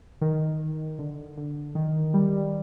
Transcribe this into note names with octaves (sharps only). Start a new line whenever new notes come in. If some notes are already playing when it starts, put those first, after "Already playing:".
D#3
D3
D3
D#3
G3